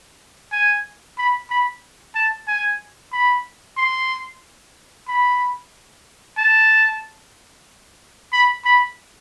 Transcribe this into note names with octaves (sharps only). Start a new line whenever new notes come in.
G#5
B5
B5
A5
G#5
B5
C6
B5
A5
B5
B5